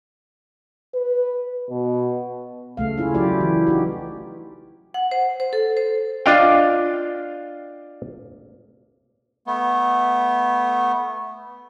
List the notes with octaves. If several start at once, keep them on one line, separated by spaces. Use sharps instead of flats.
B4
B2
C#3 A3 F5
C#4 E4 F4
F#3 E4 F4 G4 D5
F#3
E3
D#4 F#4 G4
F#5
C5
C5
A4
C5
D4 F4 D#5 F5 G5
A3 B3